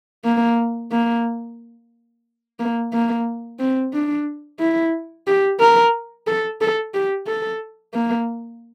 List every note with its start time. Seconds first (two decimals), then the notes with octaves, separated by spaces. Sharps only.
0.25 A#3
0.92 A#3
2.59 A#3
2.93 A#3
3.59 C4
3.93 D4
4.59 E4
5.27 G4
5.60 A#4
6.27 A4
6.61 A4
6.94 G4
7.27 A4
7.94 A#3